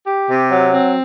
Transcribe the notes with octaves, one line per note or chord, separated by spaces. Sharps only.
G4
C3
F#3
C4